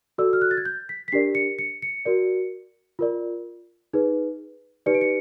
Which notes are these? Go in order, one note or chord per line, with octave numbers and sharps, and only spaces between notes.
F#4 A4 D5 E6
F6
F#6
A6
G#6
G6
B6
B6
D4 G4 A#4 D5 C7
C#7
C#7
C#7
F#4 A#4 D5
F4 A#4 D5
D#4 G#4 B4
D#4 G4 B4 D5 C#7
D7
C#7